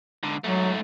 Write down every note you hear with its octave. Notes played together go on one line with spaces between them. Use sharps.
G#2 D3
G#2 F#3 A3